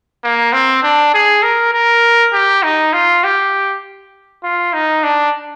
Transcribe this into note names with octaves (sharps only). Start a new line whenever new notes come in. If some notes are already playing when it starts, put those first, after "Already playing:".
A#3
C4
D4
G#4
A#4
A#4
G4
D#4
F4
G4
F4
D#4
D4